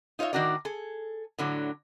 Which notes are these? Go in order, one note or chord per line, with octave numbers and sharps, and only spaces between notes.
D#4 F4 C#5 D#5 E5
A2 D#3 D4 F#4 A#4 D5
G#4 A4
A2 D3 F#3